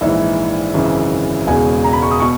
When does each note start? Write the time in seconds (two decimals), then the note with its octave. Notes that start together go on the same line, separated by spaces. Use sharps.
0.01 A#1 G#2 E3 E5
0.74 G#1 F#2 C#3 E3
1.47 E1 E2 C#3 G#3 G#5
1.84 A#5
1.93 B5
2.02 C#6
2.11 D#6
2.20 B2 C#6